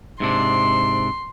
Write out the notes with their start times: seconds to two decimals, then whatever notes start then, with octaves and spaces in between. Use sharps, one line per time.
0.20 G#2 C3 D4 C6